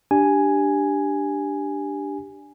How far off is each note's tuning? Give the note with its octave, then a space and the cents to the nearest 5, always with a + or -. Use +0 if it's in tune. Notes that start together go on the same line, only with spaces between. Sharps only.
D4 +0 G4 +0 G#5 +0